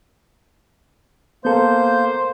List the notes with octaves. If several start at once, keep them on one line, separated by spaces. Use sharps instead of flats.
A#3 B3 A4 C5 G6